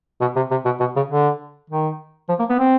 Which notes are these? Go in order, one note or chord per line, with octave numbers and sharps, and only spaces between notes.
B2
C3
C3
B2
B2
C#3
D3
D#3
F3
A#3
B3
C4